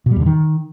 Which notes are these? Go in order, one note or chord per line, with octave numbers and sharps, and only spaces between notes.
B2
G3
E2
D3
D#3